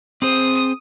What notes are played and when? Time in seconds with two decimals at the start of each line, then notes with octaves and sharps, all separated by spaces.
0.22 C4 G#4 C5 D#6